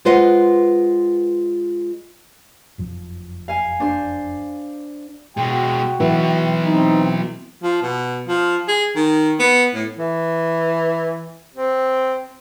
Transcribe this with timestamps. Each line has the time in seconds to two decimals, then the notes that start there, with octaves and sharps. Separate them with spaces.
0.05 G#3 F4 B4 C5 D#5 F#5
2.78 F#1 F2 F3
3.48 F5 G#5
3.80 D4 C5
5.37 B2 G#3 F#4 G5
6.00 E3 F#3 B3
6.64 C4 D#4
7.63 F3
7.82 B2
8.28 F3
8.68 G#4
8.96 D#3
9.40 B3
9.74 A2
9.98 E3
11.55 C4